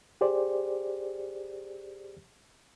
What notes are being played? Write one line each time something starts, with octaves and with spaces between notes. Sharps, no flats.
G4 G#4 C5 D5